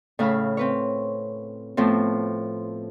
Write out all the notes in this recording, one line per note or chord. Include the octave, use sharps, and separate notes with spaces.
A2 C#3 F5 B5 F6
C4 B4 C#5
A2 F3 B3 C4